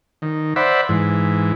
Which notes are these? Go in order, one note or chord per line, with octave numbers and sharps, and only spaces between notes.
D#3
C5 D5 E5 F#5 B5
G#2 E3